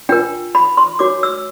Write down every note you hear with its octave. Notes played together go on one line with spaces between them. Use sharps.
D4 F4 A#4 G5
B5
C6
D4 F#4 A#4 C#5 D6
E6